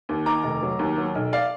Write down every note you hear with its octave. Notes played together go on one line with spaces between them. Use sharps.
D#2
D#3 A#5 D6
F1
F#3
D#2
F#3
B1
D5 F5